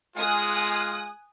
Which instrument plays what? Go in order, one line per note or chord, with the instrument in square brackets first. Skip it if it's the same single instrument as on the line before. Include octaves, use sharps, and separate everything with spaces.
[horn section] G#3 F4 [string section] G#5 D#6 F#6